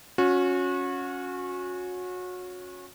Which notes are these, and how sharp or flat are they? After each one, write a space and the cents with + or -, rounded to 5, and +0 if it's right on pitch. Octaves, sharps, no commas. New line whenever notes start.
C#4 +0 F#4 -30